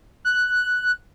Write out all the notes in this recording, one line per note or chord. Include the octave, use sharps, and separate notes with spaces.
F#6